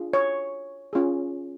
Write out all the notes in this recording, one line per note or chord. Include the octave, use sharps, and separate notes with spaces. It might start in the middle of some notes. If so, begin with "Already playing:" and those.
Already playing: D4 F4 G#4
C#5
C#4 F4 G#4